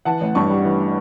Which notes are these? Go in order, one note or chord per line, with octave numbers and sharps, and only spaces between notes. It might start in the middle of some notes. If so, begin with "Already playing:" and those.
E3 F#5 A5
A1
G2 A5 C#6
G3
E3